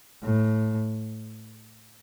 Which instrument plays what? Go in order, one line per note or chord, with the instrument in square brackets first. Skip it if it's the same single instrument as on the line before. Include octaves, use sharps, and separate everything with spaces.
[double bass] A2